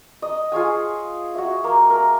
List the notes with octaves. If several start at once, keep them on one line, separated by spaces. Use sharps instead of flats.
D#5
F4 G#4 C#5 G#5
F#4 E5
A#3
A#4